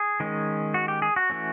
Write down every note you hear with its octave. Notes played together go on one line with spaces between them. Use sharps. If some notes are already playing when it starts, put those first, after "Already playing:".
Already playing: G#4
D#3 G#3 C#4
F#4
G4
G#4
F#4
E3 A3 C#4